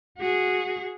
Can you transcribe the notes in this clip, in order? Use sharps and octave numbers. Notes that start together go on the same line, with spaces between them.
F#4 G#4